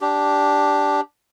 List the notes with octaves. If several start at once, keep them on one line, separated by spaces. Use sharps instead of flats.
D4 G4